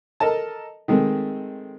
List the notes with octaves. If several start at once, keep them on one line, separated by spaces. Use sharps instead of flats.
A4 A#4 D#5 A5
D#3 G#3 A3 C4